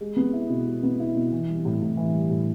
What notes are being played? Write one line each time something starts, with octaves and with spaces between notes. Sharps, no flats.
G#3
B3
E4
B2
G#3
B3
E4
B2
E3
G3
A2
A2
E3
G3
A2